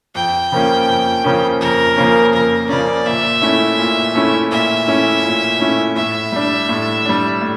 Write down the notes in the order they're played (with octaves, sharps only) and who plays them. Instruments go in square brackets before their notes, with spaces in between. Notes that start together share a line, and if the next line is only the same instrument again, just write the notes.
[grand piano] F2 [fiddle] G5
[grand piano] C#3 F3 A#3 C#4
F2
C#3 F3 A#3 C#4
[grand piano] F2 [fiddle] A#4
[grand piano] C#3 F3 A#3 C#4
[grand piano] F2 [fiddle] A#4
[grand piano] C#3 F3 A#3 C#4 [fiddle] D5
[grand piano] A#2 [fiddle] E5
[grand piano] A3 C#4 E4
A#2
A3 C#4 E4
[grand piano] A#2 [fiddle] E5
[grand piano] A3 C#4 E4
A#2
A3 C#4 E4
[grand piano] A2 [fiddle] E5
[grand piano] G3 D4
A2
G3 D4
A2